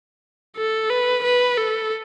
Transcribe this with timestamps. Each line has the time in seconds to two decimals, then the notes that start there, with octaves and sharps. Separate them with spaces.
0.56 A4
0.90 B4
1.23 B4
1.57 A4